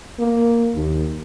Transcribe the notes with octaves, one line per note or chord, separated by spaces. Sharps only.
A#3
D#2